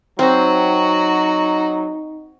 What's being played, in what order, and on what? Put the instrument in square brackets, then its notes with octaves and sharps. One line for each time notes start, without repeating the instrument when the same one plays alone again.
[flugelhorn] F#3 [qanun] C4 [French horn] D#4 [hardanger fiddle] F#4